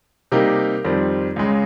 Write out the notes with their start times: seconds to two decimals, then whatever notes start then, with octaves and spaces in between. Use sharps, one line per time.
0.32 C3 G3 A#3 D#4 G4 A#4
0.84 F2 D#3 G3 C4
1.36 C#2 C#3 G#3